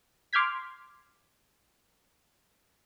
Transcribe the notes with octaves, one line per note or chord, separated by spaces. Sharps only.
C6 D6 F6 G6 G#6 B6